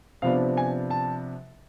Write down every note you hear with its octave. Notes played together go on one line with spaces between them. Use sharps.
C3 F3 B3 D4 F5
G#5
A5